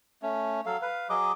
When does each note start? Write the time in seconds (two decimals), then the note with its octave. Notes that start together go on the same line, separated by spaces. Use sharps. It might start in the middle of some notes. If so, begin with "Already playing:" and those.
0.22 A3 C#4
0.66 F#3 A4 F5
0.82 B4 F5
1.09 F#3 G#4 D#5 D6